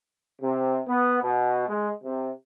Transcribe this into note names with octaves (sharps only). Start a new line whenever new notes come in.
C3
B3
B2
G#3
C3